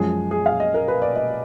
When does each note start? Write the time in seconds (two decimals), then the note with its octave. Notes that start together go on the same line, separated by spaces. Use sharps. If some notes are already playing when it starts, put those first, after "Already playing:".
Already playing: F#2 F3 G#3 G#4
0.31 G#4
0.46 F5
0.60 D#5
0.74 A#4
0.88 B4
1.02 D5
1.16 D#5